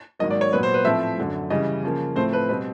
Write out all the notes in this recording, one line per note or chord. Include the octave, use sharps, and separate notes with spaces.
G#2 D#3 F#3 A#3 D#5
D5
C#5
A#2 F#3 B3 B4
C5
B4
A2 F3 A3 C4 E5
F#2 D3 F#3
C#3 E3 G3 D#5
C#3 F3 A#3
A2 F3 A3 C4 C5
B4
B2 G3 C4 B4